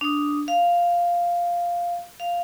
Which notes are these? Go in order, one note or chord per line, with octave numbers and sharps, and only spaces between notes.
D4 D#6
F5
F5